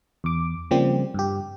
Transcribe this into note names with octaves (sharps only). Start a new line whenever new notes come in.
E2 D6
C#3 F3 G3 A#3 C4 G4
G2 G4